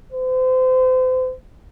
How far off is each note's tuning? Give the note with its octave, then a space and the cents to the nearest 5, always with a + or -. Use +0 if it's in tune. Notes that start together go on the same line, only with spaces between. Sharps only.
C5 -35